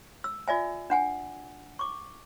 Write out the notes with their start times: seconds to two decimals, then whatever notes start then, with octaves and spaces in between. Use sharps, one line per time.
0.24 E6
0.48 F4 D5 E5 G#5
0.90 D4 F#5 G#5
1.79 C#6 D6